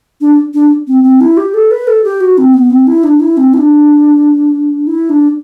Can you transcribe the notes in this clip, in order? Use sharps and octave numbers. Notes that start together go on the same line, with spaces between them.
D4
D4
C4
C4
E4
G4
A4
B4
A4
G4
F#4
C4
B3
C4
E4
D4
E4
C4
E4
D4
E4
D4